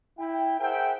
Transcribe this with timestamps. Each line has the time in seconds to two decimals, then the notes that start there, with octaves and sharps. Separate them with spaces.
0.19 E4 G5
0.60 G#4 A#4 C5 E5 F#5 G5